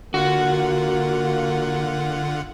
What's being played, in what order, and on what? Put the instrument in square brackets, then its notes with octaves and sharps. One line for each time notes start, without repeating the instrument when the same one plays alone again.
[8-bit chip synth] D3 F4 F#5 [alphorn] A#3 [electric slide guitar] F#4